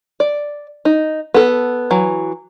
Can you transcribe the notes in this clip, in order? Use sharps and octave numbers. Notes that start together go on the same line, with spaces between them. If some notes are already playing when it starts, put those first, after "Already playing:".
D5
D#4
B3 A4
E3 F#3